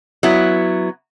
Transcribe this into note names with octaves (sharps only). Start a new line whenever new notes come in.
F#3 B3 E4